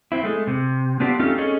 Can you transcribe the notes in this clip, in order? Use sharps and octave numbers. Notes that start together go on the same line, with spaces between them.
C4 E4
G#3 A3
C3
B3 C4 D4 F4 G4
A3 C4 C#4 D#4 F4 G4
C#4 G#4 A4 C#5 D#5